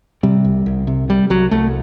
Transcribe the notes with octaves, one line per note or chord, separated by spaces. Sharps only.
C3 G3
C2
C2
C3
C3 G3
C2 F#3
C2 A3